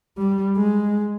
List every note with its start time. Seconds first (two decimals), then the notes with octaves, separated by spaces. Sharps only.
0.18 G3
0.57 G#3